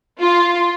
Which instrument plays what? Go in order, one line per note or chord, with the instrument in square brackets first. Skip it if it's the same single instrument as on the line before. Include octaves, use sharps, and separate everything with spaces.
[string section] F4